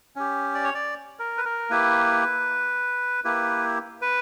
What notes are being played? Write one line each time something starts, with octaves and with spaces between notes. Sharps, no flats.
C#4 G4
D5
C#5
D5
A#4
B4
A#4
A#3 E4 G4 B4
A#3 E4 G4 B4
B4